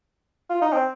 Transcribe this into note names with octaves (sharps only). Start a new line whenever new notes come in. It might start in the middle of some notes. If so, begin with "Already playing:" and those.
F4
D#4
C4